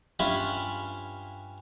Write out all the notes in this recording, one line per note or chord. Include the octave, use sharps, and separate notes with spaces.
G2 C#4 F4 E5 G#5 B5